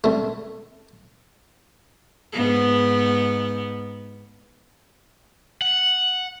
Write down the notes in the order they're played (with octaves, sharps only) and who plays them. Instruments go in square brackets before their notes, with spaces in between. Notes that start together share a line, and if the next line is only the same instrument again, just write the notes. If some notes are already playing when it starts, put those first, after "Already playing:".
[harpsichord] C2 A3
[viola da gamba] G#2 B3
[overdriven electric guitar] F#5